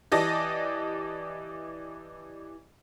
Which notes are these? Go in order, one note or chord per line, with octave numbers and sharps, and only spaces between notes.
E3 G4 D5 D#5 A5 A#6